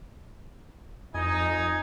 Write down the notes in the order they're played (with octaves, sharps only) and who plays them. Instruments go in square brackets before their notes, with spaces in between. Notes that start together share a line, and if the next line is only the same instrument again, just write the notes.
[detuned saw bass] F2 [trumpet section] D#4 [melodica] D#5 G#5